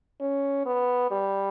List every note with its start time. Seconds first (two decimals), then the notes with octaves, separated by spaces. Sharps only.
0.20 C#4
0.66 B3
1.11 G3